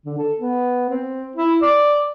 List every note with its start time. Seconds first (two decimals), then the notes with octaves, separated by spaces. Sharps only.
0.05 D3
0.18 A4
0.40 B3
0.90 C4
1.36 E4
1.62 D5